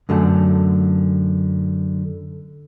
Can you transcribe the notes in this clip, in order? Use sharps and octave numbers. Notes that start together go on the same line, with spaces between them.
F#2 D3 A3 A5